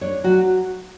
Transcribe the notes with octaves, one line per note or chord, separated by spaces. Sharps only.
D4 C#5
F#3 F#4